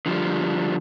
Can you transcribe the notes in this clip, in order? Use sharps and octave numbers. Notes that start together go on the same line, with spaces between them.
D3 F3 G3